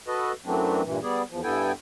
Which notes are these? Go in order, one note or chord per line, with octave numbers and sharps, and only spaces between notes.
F#4 A4 B4 D#5
F#2 E3 F#3 A3 C4 D4
G2 A#2 E3
G3 B3 G#4 D5
E2 F3
G2 B3 E4 A4 G5 G#5